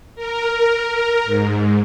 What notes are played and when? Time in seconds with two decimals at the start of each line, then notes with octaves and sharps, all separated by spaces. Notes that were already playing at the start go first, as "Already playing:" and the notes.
0.16 A#4
1.25 G#2